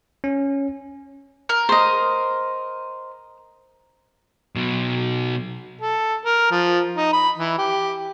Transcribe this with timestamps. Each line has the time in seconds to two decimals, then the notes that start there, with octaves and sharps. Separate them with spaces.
0.24 C#4
1.49 A#4
1.69 C5 D#5
4.56 B2 F#3
5.81 A4
6.25 A#4
6.51 F3
6.96 D#4
7.13 B5
7.37 E3
7.58 G4